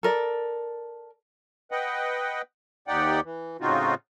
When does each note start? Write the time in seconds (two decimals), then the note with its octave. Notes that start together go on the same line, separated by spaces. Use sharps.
0.03 A4 A#4 D5
1.71 B4 D#5 F#5 G5
2.88 D#2 D#4 G4 D5 F#5 G5
3.24 E3
3.61 A2 C#3 C4 D#4 F4 F#4